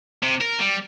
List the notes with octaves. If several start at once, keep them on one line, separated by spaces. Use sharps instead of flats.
C3
A#4
G3